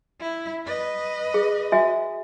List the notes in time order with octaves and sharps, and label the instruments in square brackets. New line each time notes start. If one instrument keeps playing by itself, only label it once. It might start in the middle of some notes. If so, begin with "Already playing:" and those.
[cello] E4
B4 D#5
[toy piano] G#4
F#4 E5 G#5